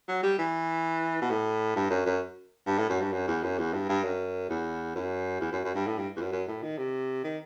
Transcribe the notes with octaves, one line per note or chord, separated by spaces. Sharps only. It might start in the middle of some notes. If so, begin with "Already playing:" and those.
F#3
G3
E3
B2
A2
G2
F#2
F#2
G2
A2
F#2
G2
F#2
E2
F#2
E2
G2
G2
F#2
E2
F#2
E2
F#2
F#2
G2
A2
G2
E2
F#2
F#2
A2
D#3
C3
D#3